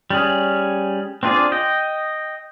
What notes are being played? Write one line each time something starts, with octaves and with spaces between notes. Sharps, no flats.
G3 C#4 G#4
C4 D4 F4 G#4 D5
D#5 G5